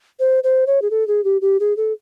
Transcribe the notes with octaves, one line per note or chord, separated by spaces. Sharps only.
C5
C5
C#5
G#4
A4
G#4
G4
G4
G#4
A4